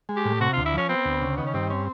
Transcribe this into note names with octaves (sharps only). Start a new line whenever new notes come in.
G#3
G4
A2
C3 F#4
D2 F4
E4
F3 C#4
B3 C4
D2
C#3
D#3 B3
C#4
G2 C4
C4 C#4